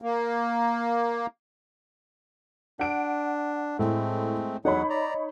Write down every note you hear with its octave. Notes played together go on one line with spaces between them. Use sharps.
A#3
D4 F#5 D7
A2 G#3 A3 C4
E2 F#3 D#4 C#5 F#5 B5
D5 A#5